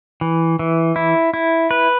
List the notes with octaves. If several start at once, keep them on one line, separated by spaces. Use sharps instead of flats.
E3
E3
E4
E4
B4